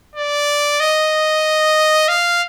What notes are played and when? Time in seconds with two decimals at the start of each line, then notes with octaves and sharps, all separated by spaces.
0.16 D5
0.80 D#5
2.09 F5